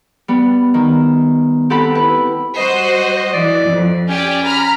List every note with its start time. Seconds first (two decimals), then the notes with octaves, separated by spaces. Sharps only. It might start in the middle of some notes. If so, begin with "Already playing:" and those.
0.28 G3 B3
0.74 D#3
1.70 C4 G4 A4 F#5 A5 B5
1.95 E4 B4
2.57 G3 F#4 C5 D#5
3.33 E3 D5
3.69 F2
4.09 C#4 G4 D5
4.45 A#5 B5 F6